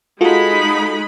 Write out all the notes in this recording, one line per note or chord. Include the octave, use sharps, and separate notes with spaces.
G#3 D#4 F4 F#4 A4 B5